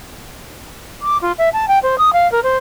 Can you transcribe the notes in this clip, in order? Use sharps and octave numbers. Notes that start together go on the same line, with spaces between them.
D6
F4
E5
A5
G5
C5
D#6
F5
A#4
C5